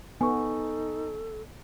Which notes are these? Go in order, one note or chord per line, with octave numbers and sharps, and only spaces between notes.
B3 D#4 A4 G#5 C#6